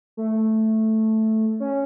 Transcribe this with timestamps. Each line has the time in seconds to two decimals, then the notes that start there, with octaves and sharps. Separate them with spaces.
0.17 A3
1.60 C#4